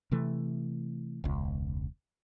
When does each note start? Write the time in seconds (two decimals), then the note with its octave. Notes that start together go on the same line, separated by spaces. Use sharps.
0.11 C3 E3 A3
1.24 E1 C#2